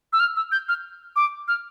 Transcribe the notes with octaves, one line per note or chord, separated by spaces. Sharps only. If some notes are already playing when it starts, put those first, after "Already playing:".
E6
F6
E6
G6
F6
D6
F6